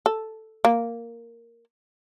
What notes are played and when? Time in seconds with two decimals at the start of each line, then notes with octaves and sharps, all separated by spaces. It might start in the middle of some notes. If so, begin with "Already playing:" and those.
0.06 A4
0.65 A#3